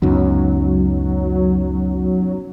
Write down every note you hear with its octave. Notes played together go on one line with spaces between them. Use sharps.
C#2 F#2 F#3 B3 C#4 D#4